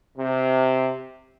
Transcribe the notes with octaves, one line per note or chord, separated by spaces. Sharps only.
C3